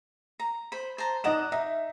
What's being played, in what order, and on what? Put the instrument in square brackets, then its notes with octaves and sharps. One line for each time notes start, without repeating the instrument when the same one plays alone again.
[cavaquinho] A#5
C5 B5
C5 A5 A#5
[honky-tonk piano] D#4 D#5 E7 [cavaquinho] D5 F#5 A#5
[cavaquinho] D#4 [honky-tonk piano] E5